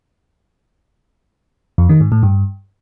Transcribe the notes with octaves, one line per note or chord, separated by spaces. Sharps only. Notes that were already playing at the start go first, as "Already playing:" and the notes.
F2
D#3
G#2
A2
G2